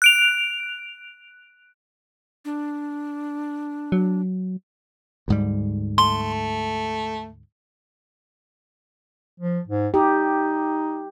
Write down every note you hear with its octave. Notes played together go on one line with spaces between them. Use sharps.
F#6 D7 F7
D4
F#3
D2 G#2 G3
A3 C6
F3
G#2
D#4 G4